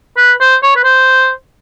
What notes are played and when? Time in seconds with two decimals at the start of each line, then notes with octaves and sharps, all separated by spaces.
0.17 B4
0.40 C5
0.62 C#5
0.76 B4
0.84 C5